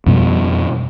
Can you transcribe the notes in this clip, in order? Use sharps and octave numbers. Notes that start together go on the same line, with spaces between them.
F2 B2 G3